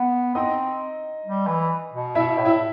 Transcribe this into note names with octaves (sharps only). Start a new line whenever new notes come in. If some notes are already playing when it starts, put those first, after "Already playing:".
Already playing: B3
C4 D#4 D#5
G3
E3
B2
B2 E4 E5
A2
E4 E5